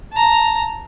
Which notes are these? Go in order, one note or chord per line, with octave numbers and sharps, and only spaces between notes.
A5 A#5